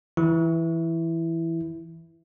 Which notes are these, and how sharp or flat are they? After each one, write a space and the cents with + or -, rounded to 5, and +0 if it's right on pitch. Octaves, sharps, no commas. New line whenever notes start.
E3 +0 E4 +0